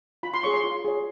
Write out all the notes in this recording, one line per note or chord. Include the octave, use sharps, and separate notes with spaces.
F4 B5
C6
G#4 C#5 C#6
C6
F4
G#4 C#5